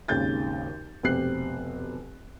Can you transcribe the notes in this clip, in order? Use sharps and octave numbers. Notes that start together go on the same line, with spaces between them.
G#1 D#2 C#3 G6 A6
F1 B2 C4 G4 F#6 C7